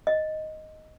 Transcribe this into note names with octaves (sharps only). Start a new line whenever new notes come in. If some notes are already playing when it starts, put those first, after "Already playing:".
D#5